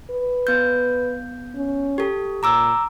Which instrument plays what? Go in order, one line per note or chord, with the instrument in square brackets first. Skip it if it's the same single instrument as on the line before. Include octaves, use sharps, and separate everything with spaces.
[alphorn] B4
[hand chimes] B3 G6
[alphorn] C#4
[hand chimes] G4 A4
[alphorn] A#2 [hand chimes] A#5 D6 E6